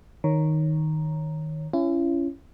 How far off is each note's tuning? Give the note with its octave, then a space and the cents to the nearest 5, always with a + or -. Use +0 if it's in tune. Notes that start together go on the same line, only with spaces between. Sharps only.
D#3 +0 C#5 -5 A#5 +0
C#4 +0 E4 +40